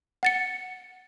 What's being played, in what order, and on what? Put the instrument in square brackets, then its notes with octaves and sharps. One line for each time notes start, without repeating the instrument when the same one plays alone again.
[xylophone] F#5 A6 C#7